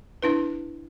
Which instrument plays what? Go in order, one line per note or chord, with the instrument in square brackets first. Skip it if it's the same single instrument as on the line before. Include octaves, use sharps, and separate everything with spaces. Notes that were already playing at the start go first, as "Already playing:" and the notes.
[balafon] D4 E4 B4